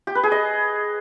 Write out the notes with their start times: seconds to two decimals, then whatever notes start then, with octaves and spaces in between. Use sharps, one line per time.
0.07 G4
0.15 B4
0.23 G#4
0.32 D#5